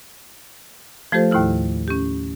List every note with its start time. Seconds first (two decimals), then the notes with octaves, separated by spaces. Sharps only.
1.12 F3 A3 F4 G4 A4 C5
1.31 D#2 A2 D#3 E4 F6
1.88 C#4 G4